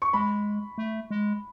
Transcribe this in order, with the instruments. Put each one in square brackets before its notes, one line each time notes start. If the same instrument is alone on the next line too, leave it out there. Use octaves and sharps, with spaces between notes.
[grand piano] C#6
[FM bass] G#3 [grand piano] B5
[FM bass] A3
G#3